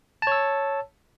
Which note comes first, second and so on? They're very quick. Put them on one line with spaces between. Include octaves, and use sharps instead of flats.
A5 C#5 E6